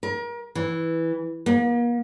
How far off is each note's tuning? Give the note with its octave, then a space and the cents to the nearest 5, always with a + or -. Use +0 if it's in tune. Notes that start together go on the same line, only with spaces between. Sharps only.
A#4 +35
E3 -5
A#3 +40